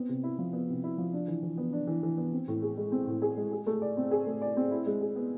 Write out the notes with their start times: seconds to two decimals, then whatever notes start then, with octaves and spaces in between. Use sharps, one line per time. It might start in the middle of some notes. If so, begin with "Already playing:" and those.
Already playing: B3 C4
0.09 C3
0.23 E4
0.38 F3
0.53 B3
0.69 C3
0.84 E4
0.98 F3
1.13 D4
1.28 E3
1.43 E3
1.58 B3
1.72 D4
1.87 E3
2.03 E3
2.17 B3
2.32 C4
2.48 A2
2.62 G#4
2.77 G#3
2.92 C4
3.07 A2
3.22 G#4
3.37 G#3
3.52 G#4
3.67 A3
3.82 D5
3.97 C4
4.11 G#4
4.27 A3
4.42 D5
4.57 C4
4.71 E4
4.86 G#3
5.01 G#4
5.16 B3